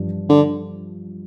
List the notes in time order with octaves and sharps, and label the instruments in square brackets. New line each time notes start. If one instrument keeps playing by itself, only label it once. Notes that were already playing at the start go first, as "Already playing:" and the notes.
Already playing: [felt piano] G2 F3
[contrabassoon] D3